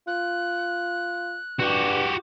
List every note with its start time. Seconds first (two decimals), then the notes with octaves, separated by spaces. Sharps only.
0.07 F4 F#6
1.60 G2 F#4 G4